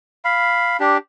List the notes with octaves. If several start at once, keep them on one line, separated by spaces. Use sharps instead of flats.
F5 B5
D4 G4